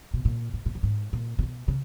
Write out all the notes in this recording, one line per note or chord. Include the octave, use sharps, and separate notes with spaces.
B2
A#2
A2
A#2
A2
G#2
A#2
C3
B2
C#3